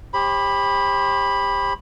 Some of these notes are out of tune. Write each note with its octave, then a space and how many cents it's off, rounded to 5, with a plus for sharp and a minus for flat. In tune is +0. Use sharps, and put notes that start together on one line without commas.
G4 +25 C5 +45 B5 +0